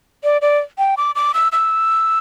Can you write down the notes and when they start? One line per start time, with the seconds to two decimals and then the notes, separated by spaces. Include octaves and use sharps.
0.24 D5
0.42 D5
0.78 G5
0.97 D6
1.15 D6
1.34 E6
1.52 E6